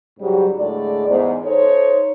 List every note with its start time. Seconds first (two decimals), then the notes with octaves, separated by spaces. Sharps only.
0.20 G#2 C#3 F#3 G3
0.59 A2 D3 G#3 D5
1.08 E2 G#2
1.44 D#4 A4 C5 C#5